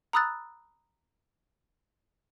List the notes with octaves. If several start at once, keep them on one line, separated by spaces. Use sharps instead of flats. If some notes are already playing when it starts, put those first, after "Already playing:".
A#5 B5 D#6 E6 F#6 A6